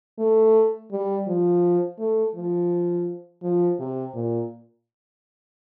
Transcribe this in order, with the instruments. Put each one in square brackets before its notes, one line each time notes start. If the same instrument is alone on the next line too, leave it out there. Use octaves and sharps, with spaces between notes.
[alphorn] A3
G3
F3
A3
F3
F3
C3
A#2